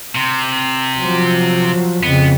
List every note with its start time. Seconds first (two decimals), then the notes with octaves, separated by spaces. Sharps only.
0.15 C3
0.98 F3 F#3
2.03 F2 C#3 B3